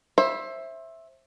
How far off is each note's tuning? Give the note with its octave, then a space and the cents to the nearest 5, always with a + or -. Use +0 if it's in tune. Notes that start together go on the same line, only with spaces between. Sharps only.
C5 +30 E5 +0 B5 +5